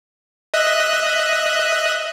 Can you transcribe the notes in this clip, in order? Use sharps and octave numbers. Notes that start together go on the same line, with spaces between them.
D#5 E5 F#6